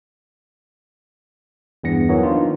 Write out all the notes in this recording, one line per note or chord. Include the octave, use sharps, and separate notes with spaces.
E2 G2 B3 A#6 C#7
D#3 E3 F#3 B3 F#4 C#5
D#3 F3 A#3 D4 D#4 F4